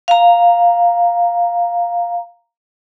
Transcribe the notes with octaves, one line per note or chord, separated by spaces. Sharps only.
F5 A#5